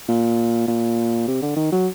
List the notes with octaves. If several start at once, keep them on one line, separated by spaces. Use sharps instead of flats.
A#2
A#2
C3
D3
D#3
F#3